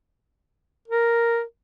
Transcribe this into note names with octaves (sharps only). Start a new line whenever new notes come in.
A#4